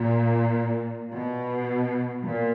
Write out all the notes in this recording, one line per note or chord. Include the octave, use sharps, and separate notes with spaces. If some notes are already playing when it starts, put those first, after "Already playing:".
Already playing: A#2
B2
A#2